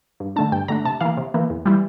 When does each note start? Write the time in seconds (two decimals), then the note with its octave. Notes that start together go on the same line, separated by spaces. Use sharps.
0.20 G2
0.36 D3 A3 D4 A5
0.52 G2 G5
0.68 D3 A3 D4 A#5
0.85 C3 A5
1.00 E3 A#3 F5
1.17 C3
1.34 E3 A#3
1.50 E2
1.66 E3 G3